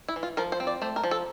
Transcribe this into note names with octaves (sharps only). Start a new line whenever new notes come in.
E4
E3
F4
F3 A#4
C5
C4
D5
A3 C5
A#4
F3
A4